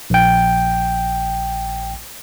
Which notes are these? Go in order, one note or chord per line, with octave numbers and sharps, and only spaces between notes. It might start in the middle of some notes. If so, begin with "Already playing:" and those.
A#1 G5